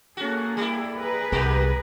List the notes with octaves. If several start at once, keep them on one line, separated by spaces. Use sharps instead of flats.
A#3 C#4 F#4 G#4 A4
G3 E4
G#4 A#4 B4
C2 G#3 B3 G4